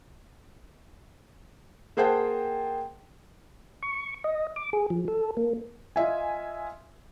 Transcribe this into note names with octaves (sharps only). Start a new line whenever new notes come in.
A#3 G#4 C5 F#5 G5 A5
C#6
D#5
D6
G#4
F3
A4
A#3
F4 D#5 E5 G#5